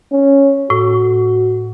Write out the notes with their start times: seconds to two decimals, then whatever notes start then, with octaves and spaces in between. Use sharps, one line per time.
0.12 C#4
0.70 A2 F#4